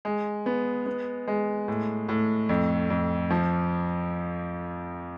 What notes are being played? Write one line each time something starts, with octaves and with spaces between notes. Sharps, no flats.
G#3
B3
B3
G#3
A2
A2
F2
F2
F3